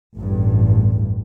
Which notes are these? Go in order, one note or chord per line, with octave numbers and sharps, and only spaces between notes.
A1 E2 G2